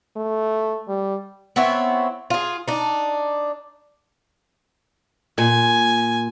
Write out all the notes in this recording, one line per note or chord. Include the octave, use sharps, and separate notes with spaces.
A3
G3
B3 C4 E4 C#5
F4 G#4
D4 D#4
A#2 G#5